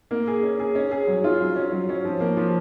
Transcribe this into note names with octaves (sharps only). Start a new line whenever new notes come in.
A#3
G#4
C#4
G#4
C#4
G#4
F#3
F4
F#3
C#4
F#3
C#4
F3
A#3
F3